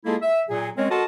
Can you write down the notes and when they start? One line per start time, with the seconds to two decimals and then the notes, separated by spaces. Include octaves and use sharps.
0.05 G#3 A#3 E4 F4 G#4 A4
0.22 E5
0.49 A#2 F#3 G#4
0.77 G#3 C4 C#4 A#4 C#5
0.90 F#4 A4 A#4 D#5 A5 C6